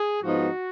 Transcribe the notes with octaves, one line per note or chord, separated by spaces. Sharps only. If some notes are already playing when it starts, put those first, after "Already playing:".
Already playing: G#4
G#2 F3 B3 D#4 F#4